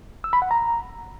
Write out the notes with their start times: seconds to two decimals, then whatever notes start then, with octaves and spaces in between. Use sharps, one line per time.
0.24 E6
0.33 B5
0.42 F#5
0.51 A#5